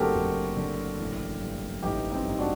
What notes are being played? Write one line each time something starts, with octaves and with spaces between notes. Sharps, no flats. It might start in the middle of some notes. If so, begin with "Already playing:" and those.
Already playing: F#1 D3 A3 C4 F#4 G4 A4 A#4
F#1
D3
A1
G2
A1 D#4 G4
C4 D#4
G2 D#4
D4 F#4